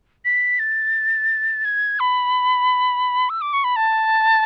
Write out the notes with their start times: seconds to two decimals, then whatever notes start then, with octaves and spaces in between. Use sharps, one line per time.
0.25 B6
0.59 A6
1.65 G#6
2.00 B5
3.30 E6
3.41 D6
3.53 C#6
3.64 B5
3.76 A5